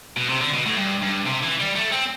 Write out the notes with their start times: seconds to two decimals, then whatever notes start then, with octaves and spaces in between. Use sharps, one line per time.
0.17 B2
0.29 C3
0.41 D3
0.54 B2
0.66 A2
0.77 G2
1.02 G2
1.26 C3
1.43 E3
1.60 G3
1.75 A3
1.91 C4